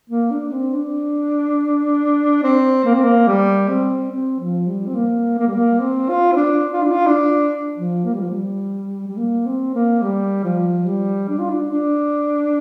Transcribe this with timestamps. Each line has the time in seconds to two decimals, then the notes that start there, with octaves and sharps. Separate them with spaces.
0.10 A#3
0.31 D4
0.52 C4
0.74 D4
2.43 C4
2.85 A#3
2.94 C4
3.04 A#3
3.27 G3
3.68 C4
4.11 C4
4.40 F3
4.67 G3
4.87 C4
4.95 A#3
5.38 A#3
5.47 G3
5.55 A#3
5.80 C4
6.09 F4
6.32 C4
6.36 D4
6.73 F4
6.83 D4
6.91 F4
7.07 D4
7.78 F3
8.05 A#3
8.13 G3
8.21 F3
8.29 G3
9.08 G3
9.17 A#3
9.46 C4
9.74 A#3
10.02 G3
10.44 F3
10.86 G3
11.29 D4
11.39 F4
11.50 D4
11.71 D4